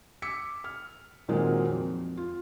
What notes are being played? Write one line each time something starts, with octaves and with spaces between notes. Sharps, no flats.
D6 E6 B6 C#7
F6
A#2 D#3 F#3 G#3 A#3 C4
F2
F4